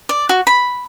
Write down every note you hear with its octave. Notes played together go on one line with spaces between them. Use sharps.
D5
F#4
B5